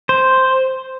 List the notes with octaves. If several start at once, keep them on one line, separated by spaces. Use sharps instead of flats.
C5